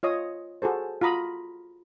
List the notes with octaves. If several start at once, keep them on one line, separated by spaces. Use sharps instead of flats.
F4 C#5 D#5 D#6
F#4 G#4 A4 C5
F4 F#4 A#5 B5 D#6